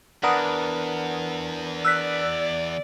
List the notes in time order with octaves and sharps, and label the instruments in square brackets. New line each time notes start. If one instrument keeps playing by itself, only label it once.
[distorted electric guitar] E2 [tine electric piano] D4 A#4 B4 [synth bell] F#5 D#6
[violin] D5 [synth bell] E6 F#6 B6